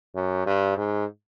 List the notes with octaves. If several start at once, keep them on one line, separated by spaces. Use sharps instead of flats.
F#2
G2
G#2